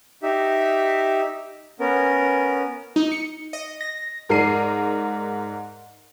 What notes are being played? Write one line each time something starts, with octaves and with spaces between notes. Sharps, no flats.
D#4 G4 E5
B3 C#4 A#4
D#4
C#7
D#5
A#6
G#2 A#4 D5 C7 D#7